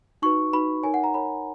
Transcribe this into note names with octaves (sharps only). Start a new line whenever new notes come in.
D#4 F#4 B4 C#6
D#4 F#4 B4 B5
D#4 A#4 C#5 G#5
F#5
A#5
D#4 A#4 C#5 B5